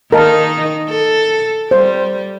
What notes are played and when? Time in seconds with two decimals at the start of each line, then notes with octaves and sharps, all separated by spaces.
0.12 D#3 D#4 A#4 D#5 A5
0.89 A4
1.71 G3 C5